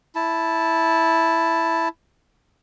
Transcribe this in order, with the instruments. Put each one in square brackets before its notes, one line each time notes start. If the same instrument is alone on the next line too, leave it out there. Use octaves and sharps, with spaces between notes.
[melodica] E4 A5